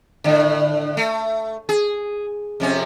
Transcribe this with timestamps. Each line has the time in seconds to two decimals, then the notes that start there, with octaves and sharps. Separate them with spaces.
0.24 A2 D3
0.97 A3
1.69 G#4
2.60 F2 C3 C#4